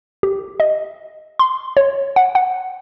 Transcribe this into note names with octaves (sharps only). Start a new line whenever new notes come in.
G4
D#5
C6
C#5
F#5
F#5